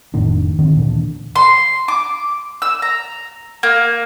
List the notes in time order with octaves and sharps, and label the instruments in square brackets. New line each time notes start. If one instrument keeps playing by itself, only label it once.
[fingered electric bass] F1 A2 D#3 D4
D#3 C4
D2 A#2 E3 D4
[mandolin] C6
D6
E6
A#5
A#3